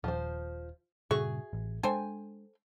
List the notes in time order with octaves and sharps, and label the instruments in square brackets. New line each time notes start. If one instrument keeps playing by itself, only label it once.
[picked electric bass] D#1 [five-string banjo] F3 C5
[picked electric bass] G2 A#2 C#3 [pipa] F#4 E5 C#6 [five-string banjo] G#4
[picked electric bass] A1
[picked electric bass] G#3 D4 [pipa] A4 C5 G5 [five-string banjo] G#5